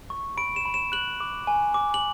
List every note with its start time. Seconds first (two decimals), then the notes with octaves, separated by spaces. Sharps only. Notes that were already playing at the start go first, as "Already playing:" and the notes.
0.10 C#6
0.37 B5 D7
0.56 E7
0.65 B5
0.74 E7
0.92 F#6 F#7
1.20 D6
1.47 G#5
1.74 D6
1.94 F#7